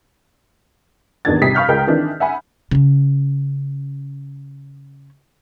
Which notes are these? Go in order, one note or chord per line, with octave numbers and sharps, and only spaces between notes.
F1 E2 D#3 D4 G#6 A6
C3 G3 D#6 B6 C7
F5 B5 C#6 F6 G6
C#2 G#3 A#4 G5 G6
D#3 E3 C4 D4
E5 F#5 G#5 B5
C#3 C#4